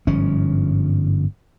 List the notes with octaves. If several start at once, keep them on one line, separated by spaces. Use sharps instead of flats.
G1 G#2 F3 C#4